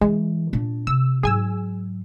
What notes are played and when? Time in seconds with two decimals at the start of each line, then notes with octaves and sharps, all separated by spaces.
0.01 E3 G#3
0.53 A#2 D4
0.87 C3 E6
1.23 G#2 F#3 G#4 G#5 E6